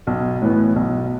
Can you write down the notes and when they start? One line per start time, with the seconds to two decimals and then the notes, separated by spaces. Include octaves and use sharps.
0.07 B1
0.42 A2 E3 B3
0.76 B1